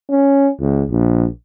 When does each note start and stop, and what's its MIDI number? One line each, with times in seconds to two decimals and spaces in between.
0.10 0.49 61
0.60 0.83 37
0.91 1.26 34